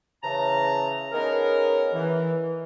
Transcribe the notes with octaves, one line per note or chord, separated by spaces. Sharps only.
C#3 E3 A5 A#5
B3 C#4 D#4 G#4 A#4
E3